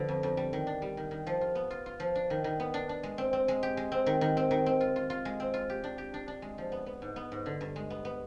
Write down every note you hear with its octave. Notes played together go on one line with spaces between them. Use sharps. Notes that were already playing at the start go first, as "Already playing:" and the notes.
Already playing: D3 F3 B3
F2
F2
G3
D#3
D4
G3
D#3
D#3
F3
F4
B3
F4
F4
F3
D4
D#3
D#3
B3
D4
D4
G#3
C4
C4
G#3
G4
G#3
C4
D#3
D#3
C4
D#3
C4
F4
F4
F4
G#3
C4
F4
G4
D4
G4
D4
D4
G#3
F3
B3
B3
G#2
B3
G#2
D3
G2
G#3
B3
B3